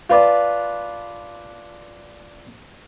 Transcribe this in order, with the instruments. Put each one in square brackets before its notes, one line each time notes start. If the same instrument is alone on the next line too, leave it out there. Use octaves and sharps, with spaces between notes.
[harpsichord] F4 B4 D5 A5